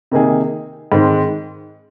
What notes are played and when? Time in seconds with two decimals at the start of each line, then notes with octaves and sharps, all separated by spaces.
0.11 C3 D#3 A#3 D#4 G#4
0.92 G#2 D#3 G#3 C4